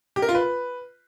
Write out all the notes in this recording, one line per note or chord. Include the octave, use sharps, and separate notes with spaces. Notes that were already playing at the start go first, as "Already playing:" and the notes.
G4
A#4
F4
B4